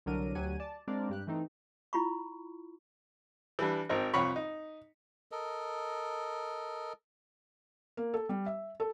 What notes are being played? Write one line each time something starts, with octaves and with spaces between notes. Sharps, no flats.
C2 D3 F#3 D4 A#4 D#7
D2 F#3 G4 F#5 G#5 D#7
D5 A5
G#3 C4 D4 A#4 D5 F5
G2 G4 F#6
E3 A3 C4 D#4
E4 F4 B5 C#6
E3 G3 D4
G#1 C4 D#4 A#4
C2 F2 C#5 B5 C#6
D#4
A4 A#4 D#5
A#3
A4
G3
E5
A4